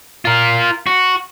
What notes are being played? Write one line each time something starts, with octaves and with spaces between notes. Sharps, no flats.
F4 A#4
F#4